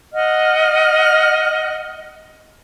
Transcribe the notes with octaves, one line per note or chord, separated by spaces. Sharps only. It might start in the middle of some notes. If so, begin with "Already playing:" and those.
D#5 F#5 F6